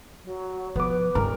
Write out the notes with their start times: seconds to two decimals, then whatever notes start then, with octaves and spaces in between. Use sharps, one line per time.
0.25 F#3
0.76 F3 B3 B4 D6
1.15 D#1 G2 A#4